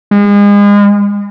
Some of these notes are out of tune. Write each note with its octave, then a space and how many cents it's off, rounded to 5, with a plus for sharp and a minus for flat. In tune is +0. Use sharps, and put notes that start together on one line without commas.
G#3 -35